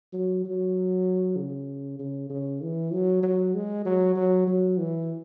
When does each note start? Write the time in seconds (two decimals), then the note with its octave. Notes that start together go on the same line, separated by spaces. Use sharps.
0.13 F#3
0.45 F#3
1.37 C#3
1.99 C#3
2.30 C#3
2.62 E3
2.92 F#3
3.23 F#3
3.54 G#3
3.85 F#3
4.16 F#3
4.47 F#3
4.78 E3